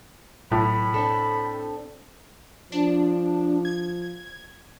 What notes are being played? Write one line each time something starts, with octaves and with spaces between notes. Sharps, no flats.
B1 A2 B5
C4 D4 A4
F3 D4
G#6